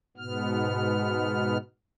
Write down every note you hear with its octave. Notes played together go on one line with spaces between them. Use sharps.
G#2 B2 B3 F6